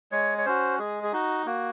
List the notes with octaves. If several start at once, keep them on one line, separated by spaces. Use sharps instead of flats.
G#3 C#5
C#5
C#4 F#4 C5
G#3 G#4
G#4
D#4 F#4
A#3 F#4